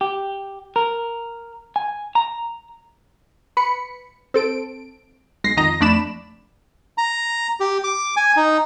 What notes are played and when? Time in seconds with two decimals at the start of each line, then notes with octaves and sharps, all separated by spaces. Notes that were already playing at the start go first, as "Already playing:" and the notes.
0.01 G4
0.76 A#4
1.76 G#5
2.15 A#5
3.57 B4 B5 C#7
4.34 C4 A4 D7
5.44 B1 G#3 A#6 C7
5.57 F2 D#3 D#5 A#5 A#6
5.81 F2 A3 D4 D5 B5 E7
6.98 A#5
7.60 G4
7.84 D6
8.16 G#5
8.37 D#4